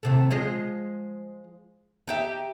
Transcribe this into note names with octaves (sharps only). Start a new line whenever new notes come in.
D#2 C3 A3
F3 G#3 D#5
D#4 G4 E5